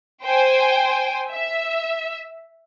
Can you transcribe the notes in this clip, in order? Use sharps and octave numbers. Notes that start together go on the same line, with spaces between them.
C5 G5 G#5
E5